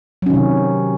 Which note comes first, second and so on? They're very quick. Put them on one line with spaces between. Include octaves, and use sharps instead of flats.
F#3 C#4 D#3 C3